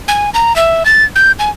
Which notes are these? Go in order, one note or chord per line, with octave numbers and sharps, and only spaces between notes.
G#5
A#5
E5
A6
G6
G#5